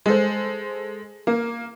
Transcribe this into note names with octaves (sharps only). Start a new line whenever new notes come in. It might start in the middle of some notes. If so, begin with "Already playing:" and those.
G#3 A4 C5
A#3